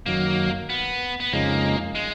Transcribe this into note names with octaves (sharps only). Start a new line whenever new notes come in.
F#2 D#3 F#3 A#3
B3
B3
F2 C#3 G#3 A#3 D#4
G#3